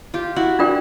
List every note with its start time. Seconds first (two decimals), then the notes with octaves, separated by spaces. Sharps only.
0.14 F4 G4
0.36 E4 F#4
0.59 D4 F4 A#4 D5 G5